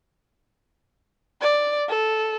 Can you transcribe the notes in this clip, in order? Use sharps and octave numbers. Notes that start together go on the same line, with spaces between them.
D5
A4